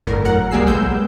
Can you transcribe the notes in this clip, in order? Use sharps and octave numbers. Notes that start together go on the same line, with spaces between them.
G1 F2 A2 A#4
F#3 A#4 F#5
C#2 G3 A#3 G#4 E6 C7
B1 G#3 B3 E6 G6